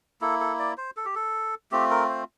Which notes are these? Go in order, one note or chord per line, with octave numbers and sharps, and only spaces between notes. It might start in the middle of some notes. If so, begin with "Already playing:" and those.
A#3 E4 A4
A4
D5
C5
A4
G4
A4
A3 C4 F4 G4
A#4
C5